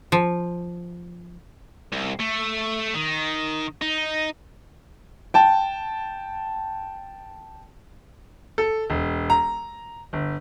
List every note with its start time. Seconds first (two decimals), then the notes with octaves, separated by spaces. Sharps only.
0.12 F3
1.92 C2
2.19 A3
2.94 D#3
3.82 D#4
5.34 G5 A5
8.58 A4
8.90 E1
9.30 A#5
10.13 G1